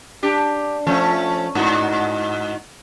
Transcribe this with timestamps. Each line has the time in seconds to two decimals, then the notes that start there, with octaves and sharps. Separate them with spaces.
0.23 D4 G4
0.87 F3 A3 C#4
1.55 G#2 D#4 F#4